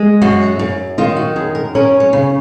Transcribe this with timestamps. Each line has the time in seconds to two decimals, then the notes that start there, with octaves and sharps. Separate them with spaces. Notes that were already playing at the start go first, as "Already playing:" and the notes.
Already playing: G#3
0.22 F#2 F#4
0.59 F#2
0.98 D#3 F4
1.16 F#4
1.36 F#2 G#4
1.55 A#4
1.75 C#4 A#4
2.00 C#5
2.13 C#3